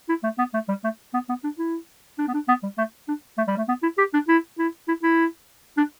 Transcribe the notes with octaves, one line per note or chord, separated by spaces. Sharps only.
E4
A3
B3
A3
G3
A3
B3
B3
D4
E4
D4
B3
D4
B3
G3
A3
D4
A3
G3
A3
B3
E4
G4
D4
E4
E4
E4
E4
D4